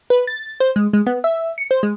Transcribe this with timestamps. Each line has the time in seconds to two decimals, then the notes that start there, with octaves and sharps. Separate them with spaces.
0.10 B4
0.27 A6
0.60 C5
0.76 G#3
0.93 G#3
1.07 B3
1.24 E5
1.58 C#7
1.71 C5
1.83 G#3